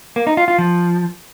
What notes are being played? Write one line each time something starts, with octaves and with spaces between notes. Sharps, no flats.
A#3
D#4
F4
F4
F3